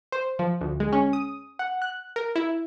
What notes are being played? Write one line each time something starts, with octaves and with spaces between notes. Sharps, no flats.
C5
F3
D2
G#3
C#4
D#6
F#5
F#6
A#4
E4